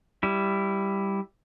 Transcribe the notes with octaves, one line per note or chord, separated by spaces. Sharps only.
G3 E4